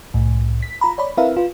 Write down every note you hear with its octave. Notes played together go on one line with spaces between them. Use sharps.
C2 A2
B6
F4 A#5 B5
C#5 D5 B5
C4 E4 A#4 B4 E5 F5
F4 B4